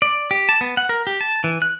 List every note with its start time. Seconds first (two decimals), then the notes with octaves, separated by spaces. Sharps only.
0.02 D5
0.31 G4
0.49 A5
0.61 B3
0.77 F#5
0.89 A#4
1.07 G4
1.21 A5
1.44 E3
1.62 F#6